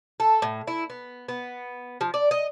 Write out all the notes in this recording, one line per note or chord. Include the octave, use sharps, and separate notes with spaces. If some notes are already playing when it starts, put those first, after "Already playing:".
A4
A2
E4
B3
B3
F3
D5
D#5